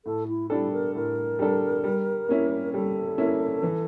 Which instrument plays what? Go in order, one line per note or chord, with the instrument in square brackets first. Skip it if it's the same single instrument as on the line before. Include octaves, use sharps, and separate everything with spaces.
[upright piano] A2 [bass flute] A4
[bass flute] E4
[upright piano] G3 D4 A4 [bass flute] E4
[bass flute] A#4
[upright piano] A2 [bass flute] A#4
[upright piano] G3 D4 A4
G3
A#3 C#4 E4
[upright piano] G3 [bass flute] A4
[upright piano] A#3 C#4 E4
E3